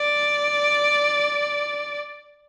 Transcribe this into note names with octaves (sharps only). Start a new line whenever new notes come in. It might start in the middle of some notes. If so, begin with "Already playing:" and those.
Already playing: D5